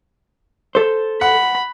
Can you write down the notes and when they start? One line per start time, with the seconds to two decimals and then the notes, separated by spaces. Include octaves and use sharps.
0.75 A4 C5
1.21 F#5 B5